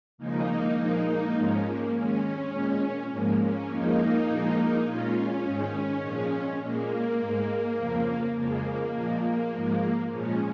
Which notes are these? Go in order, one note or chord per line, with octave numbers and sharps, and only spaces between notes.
D#2 C#3 F3 G#3 A#3 D#4
A#2 F3 G#3 A#3 D#4
A#3 D#4
G#2 F3 G#3 C#4
A#3
D#2 D#3 G#3 C#4
A#2 G#3
G#2 F3 G#3 A#3
C#4
F2 F3 G#3 A#3 D#4
A#2 F3 G#3
A#2 G#3 C#4 F4
C#4
G#2 D#3 G#3
A#2 F3 G#3
A#2 G#3 A#3
G#2 G#3
F2 C#3 F3
F2 C#3 F3 G#3 A#3
A#2 F3 G#3
G#2 F3 G#3
A#2 F3 G#3 C#4